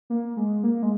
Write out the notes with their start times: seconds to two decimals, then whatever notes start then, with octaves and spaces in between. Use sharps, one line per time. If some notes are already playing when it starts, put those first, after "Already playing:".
0.10 A#3
0.37 G#3
0.63 A#3
0.82 G#3